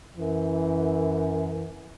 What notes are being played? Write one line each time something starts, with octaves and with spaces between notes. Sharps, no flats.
F#2 E3